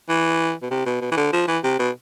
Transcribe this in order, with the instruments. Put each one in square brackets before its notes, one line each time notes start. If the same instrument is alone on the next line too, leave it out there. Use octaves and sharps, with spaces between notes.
[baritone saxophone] E3
B2
C3
B2
B2
E3
D3
F3
E3
C3
B2